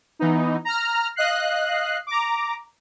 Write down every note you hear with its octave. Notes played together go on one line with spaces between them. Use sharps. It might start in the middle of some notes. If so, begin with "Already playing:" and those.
E3 B3 D#4
A#5 F6
D#5 F5 F#6 C7
A#5 D6